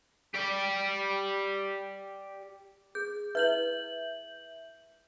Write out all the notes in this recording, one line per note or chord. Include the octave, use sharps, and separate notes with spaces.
G4 D5
G#4 G6
E4 B4 E5 G6 F#7